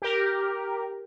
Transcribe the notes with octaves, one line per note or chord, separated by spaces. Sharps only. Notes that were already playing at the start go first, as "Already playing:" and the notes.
G4 A#4